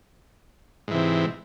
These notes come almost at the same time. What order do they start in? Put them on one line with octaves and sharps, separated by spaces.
G#2 E3 C3